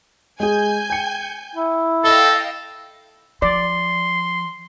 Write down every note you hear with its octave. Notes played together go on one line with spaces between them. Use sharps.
G#3 G#4 G#5 G6
G5 C#7
E4
A4 D#5 F5 G5 A5 G7
F3 D5 C6